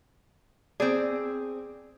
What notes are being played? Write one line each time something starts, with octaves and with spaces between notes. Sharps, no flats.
C4 G#4 D5